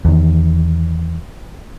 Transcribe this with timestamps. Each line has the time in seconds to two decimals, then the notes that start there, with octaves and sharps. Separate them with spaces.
0.05 E2 D#3